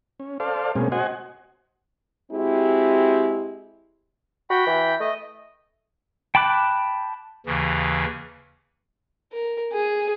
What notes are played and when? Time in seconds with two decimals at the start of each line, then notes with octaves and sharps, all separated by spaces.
0.20 C#4
0.40 A4 C5 D5 F5
0.76 B2 G#3 A#3 C4 C#4 G#4
0.92 F#4 C5 D#5 F#5 G#5
2.31 G#3 C4 E4 F#4 G4
4.50 F#4 G5 B5
4.67 E3
5.00 A3 D#5
6.35 G5 A5 B5 D6 F#6
7.46 D#2 C#3 E3
9.32 A#4
9.72 G#4